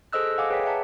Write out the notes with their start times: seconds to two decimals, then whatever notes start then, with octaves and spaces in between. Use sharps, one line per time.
0.13 G#4 A4 C5 D#5 E6 F#6
0.26 A4
0.38 D#5 F5 F#5 G#5 D6
0.50 G#4 B4 C#5 G5 D6 B6
0.65 E5 F#5 A5 A#5